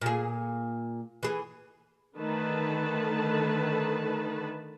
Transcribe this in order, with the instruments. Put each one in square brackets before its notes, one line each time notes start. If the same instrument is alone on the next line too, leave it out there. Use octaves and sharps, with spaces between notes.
[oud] A#2 G#4
E3 G#4
[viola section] D3 D#3 A3 B4 A5